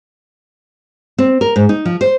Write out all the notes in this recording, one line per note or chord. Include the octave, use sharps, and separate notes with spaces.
C4
A#4
G#2
D#4
F3
C5